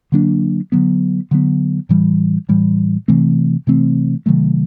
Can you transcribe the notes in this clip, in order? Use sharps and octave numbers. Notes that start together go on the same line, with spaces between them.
D3 F#3 A#3 D4
D3 F#3 B3
D3 F#3 B3
A2 E3 G3
A2 E3 G3
C3 E3 A3 C4
C3 E3 A3 C4
C3 D#3 F#3 A3